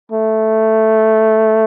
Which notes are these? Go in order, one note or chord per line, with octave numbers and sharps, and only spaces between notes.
A3